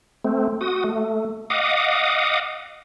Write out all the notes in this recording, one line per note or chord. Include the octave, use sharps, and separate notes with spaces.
A3 C4
F#4 D#6
A3
D#5 F5 F#5 D6 D#6